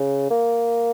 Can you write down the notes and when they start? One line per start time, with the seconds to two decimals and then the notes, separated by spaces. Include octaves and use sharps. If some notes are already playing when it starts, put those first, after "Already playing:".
Already playing: C#3
0.30 A#3